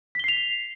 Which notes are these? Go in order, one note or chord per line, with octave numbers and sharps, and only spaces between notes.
B6 C7 F7 G7